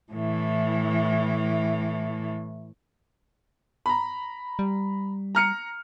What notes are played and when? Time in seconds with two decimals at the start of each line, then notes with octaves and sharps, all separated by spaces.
0.12 A2 E3
3.86 A#5 B5
4.59 G3
5.35 A#5 F6 C#7